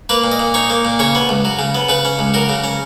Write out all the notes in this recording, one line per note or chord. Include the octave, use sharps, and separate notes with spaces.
A#3 B4
A#2
D#5
A#2
D#4 C#5
A#3
A#2
C#3 C#5
B3
C#2
F#3
C#3
B3
C#3 B4
C#4
C#2
F#3 A#4
C#3
C#4